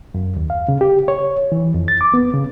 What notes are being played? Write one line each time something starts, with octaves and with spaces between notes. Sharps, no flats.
F#2
D#2
F5
C#3
G4
C#5
E3
F2
A6
D6
B3
C#3